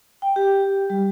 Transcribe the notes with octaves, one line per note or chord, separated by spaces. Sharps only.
G5
G4
G3